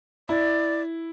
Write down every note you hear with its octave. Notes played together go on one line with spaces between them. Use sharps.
E4 D5